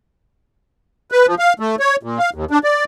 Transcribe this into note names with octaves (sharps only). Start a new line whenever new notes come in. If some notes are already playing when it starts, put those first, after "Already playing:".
B4
F3
F5
A3
C#5
A#2
F5
D#2
D4
D5